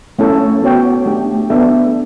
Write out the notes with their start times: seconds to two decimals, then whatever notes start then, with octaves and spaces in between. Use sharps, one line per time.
0.19 A3 C#4 E4 A4 C#5
0.62 B3 F#4 C#5 G5
1.06 A3 D4 G4
1.50 B3 D4 A4 E5